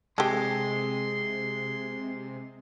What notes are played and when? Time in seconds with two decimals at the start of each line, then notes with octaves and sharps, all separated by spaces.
0.18 C3 G#3 G4 A4 C6